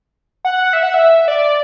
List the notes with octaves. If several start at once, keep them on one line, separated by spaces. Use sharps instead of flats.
F#5
E5
F#5
E5
D5